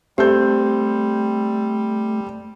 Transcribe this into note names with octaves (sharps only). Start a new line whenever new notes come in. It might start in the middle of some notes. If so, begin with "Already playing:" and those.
G3 A3 C4 G4 A4 G6